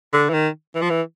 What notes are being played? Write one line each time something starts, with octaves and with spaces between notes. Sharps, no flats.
D3
E3
D#3
E3
F3
E3